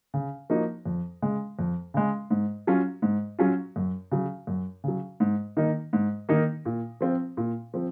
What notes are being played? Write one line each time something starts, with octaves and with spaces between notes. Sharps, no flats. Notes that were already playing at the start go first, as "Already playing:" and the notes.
C#3
F3 A#3 D#4 F#4
F2
C#3 G#3
F2
C#3 G#3
G#2
F#3 C#4 F4
G#2
F#3 C#4 F4
F#2
C#3 F#3
F#2
C#3 F#3
G#2
D#3 A#3 D#4
G#2
D#3 A#3 D#4
A#2
F3 C4 F4
A#2
F3 C4